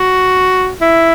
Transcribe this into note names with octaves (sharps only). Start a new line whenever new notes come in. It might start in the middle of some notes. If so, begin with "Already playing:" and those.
Already playing: F#4
E4